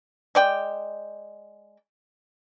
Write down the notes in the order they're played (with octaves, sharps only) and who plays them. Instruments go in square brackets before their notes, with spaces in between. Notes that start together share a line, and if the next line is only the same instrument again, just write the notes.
[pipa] G#3 D5 G5